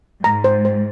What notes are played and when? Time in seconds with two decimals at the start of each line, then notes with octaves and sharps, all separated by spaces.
0.24 G#2 A#5
0.44 C5
0.65 C5